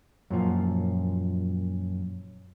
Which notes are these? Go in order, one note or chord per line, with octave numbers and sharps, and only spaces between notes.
F#2 A#2 F3